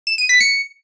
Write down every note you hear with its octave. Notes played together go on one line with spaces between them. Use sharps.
E7
D#7
B6
C#7